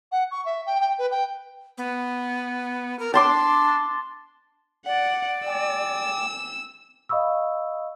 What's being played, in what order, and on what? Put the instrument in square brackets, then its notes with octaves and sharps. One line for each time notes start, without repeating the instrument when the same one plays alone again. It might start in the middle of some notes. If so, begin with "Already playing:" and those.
[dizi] F#5
C#6
E5
G5
G5
B4
G5
[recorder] B3
A#4
[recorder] D4 [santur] A5 C6 D6
[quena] D5 [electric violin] F#5
[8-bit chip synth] G5 G#5 D6 [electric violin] E6
[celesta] D#5 F5 B5 C#6 D#6 E6